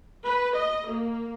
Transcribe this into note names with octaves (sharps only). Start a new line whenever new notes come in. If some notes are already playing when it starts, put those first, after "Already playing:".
B4
D#5
A#3